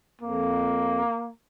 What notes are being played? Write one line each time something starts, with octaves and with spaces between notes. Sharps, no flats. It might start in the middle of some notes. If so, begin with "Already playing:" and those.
F2 A#3